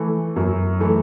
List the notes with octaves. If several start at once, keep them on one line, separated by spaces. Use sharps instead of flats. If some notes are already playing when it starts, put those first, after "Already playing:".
Already playing: E3 A3
F#2
E3 A3